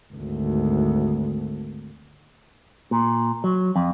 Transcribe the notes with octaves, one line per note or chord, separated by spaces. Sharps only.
G#1 D2
A#2
F#3
F2